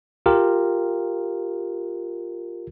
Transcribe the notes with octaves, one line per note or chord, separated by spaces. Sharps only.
F4 G4 A#4